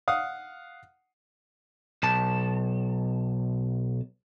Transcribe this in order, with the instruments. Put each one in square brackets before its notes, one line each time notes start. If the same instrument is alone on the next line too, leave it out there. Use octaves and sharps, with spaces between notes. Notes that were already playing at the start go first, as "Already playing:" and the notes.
[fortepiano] F5 F#5 D#6
[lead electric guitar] B1 A5